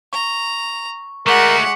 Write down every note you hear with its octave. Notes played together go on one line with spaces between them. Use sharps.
A#5 C#6
G#3 A3 F#4 A#4 F#5 C#6 D6 B6